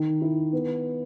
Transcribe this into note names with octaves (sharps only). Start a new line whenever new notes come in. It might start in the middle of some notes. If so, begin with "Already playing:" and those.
Already playing: D#3
E4
B3